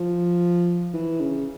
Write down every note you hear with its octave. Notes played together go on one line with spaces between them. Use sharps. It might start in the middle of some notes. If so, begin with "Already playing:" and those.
Already playing: F3
E3
C#3